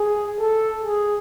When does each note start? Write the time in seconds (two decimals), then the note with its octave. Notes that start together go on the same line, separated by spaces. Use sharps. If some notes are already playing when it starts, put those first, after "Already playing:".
Already playing: G#4
0.40 A4
0.84 G#4